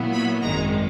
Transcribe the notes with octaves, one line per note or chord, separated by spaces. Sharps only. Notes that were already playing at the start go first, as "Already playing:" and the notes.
Already playing: A#2 F#3 B3 E4
B5
G#1 F#2 D#3 G#3 A#5